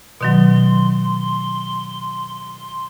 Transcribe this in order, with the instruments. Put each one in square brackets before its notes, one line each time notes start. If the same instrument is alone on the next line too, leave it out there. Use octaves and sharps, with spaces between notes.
[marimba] B2 D#3 F#3 [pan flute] C6